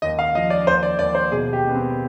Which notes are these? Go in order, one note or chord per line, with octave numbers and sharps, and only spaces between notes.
D#2 D#5
F5
F3 D#5
D5
D#2 C5
D5
D#2 D5
C5
B2 G#4
G4
B2
B3
C4